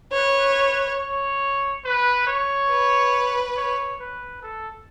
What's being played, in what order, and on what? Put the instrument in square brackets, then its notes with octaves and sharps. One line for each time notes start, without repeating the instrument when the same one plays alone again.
[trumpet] B4 [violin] C#5
[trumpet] C#5
B4
C#5
[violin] B4
[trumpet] C#5
B4
A4